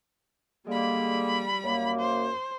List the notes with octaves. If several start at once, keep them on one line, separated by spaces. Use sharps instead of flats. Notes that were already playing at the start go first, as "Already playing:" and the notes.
D3 G3 G#3 A#3 B5
F#2 A#3
C5